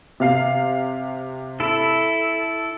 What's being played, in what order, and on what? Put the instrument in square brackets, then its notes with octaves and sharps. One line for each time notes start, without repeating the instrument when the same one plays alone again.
[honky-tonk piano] C3 F5 C7
[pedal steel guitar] E4 A4